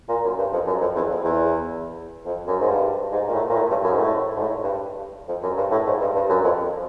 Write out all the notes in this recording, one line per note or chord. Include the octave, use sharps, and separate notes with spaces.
A#2
F#2
G2
F2
F#2
F2
E2
F2
E2
F2
F#2
G#2
G2
G#2
A#2
A2
A#2
A2
G2
F#2
G#2
A2
G#2
A2
G2
F2
F#2
G2
A2
G#2
G2
G2
F#2
F2